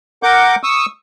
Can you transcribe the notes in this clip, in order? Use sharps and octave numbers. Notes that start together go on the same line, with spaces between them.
A#4 F#5 D6 G6
C#6 D#6 E6